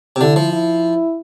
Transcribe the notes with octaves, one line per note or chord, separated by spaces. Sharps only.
C3
D3 E4
F3
E4